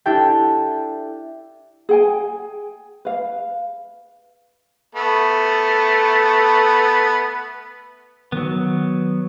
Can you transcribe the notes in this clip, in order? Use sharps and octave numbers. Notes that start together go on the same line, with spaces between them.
D4 E4 G4 A4 G5
G#4 G5 G#5
B4 F5
A3 B3
D#3 F#3 B3